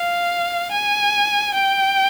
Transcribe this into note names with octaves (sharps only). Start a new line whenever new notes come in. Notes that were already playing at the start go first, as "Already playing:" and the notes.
Already playing: F5
G#5
G5